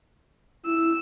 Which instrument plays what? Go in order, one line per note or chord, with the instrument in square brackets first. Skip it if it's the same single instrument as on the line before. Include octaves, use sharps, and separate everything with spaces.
[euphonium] E4 [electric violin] E6